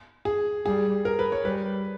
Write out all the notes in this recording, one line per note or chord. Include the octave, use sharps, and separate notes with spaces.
G#4
G3 G#4
A#4
B4
C#5
G3 B4